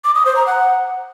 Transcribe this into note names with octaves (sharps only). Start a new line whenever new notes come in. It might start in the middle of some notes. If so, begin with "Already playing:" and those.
D6
D#6
C5
A#5
F#5